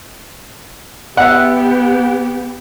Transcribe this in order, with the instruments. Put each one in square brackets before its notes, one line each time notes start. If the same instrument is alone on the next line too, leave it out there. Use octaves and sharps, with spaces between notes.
[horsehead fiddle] B3 G4 [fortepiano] E5 F#5